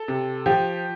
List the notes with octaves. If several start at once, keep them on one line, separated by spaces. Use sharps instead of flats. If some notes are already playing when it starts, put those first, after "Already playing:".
Already playing: A4
C3
F3 G4